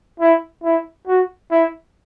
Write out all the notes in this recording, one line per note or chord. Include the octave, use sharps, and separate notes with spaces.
E4
E4
F#4
E4